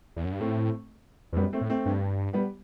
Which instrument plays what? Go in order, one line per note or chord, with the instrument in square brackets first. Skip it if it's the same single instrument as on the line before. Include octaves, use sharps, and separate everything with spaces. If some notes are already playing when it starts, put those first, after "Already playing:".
[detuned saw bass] E2
F#2
G2
[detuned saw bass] A2 [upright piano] A3 C4
[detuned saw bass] E2
[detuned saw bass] F#2 [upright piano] G3 B3
[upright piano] A3 C4
[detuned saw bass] A2
[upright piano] A3 C4
[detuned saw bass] G2
[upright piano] G3 B3